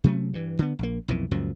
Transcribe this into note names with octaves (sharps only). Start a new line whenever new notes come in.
C3 F#3 A3 C#4
G2 E3
D3 B3
A#1 A#3
B1 F2 A#2 E3
C#2 F#2 A#2 F3